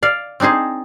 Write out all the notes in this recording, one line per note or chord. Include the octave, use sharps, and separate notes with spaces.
D5 F5
C4 D4 D#4 G#4 C5